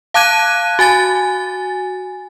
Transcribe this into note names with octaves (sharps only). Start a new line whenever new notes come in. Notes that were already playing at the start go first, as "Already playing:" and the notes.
F5 A5 D6 F#6 G#6 D#7
F#4 G#5 A6